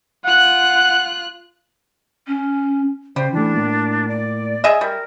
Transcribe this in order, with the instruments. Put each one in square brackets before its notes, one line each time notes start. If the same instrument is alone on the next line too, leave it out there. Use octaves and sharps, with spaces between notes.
[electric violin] F4 F#6 [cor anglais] F#5
[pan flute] C#4
[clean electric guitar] C#3 [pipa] G3 [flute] C5
[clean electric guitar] E3 A3 [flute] D4
[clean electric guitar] A2 A#3
[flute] D5
[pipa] G#4 D#5 E5
[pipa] G3 [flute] A#4